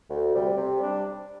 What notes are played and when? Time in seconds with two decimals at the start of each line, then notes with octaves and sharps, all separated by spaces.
0.10 D2
0.34 C3 G3
0.56 C3
0.80 G3 D4